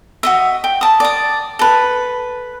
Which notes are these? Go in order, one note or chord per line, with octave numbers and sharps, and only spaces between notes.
F#4 D#5 E5
G5
A5 D#6
D5 D#6
A4 B4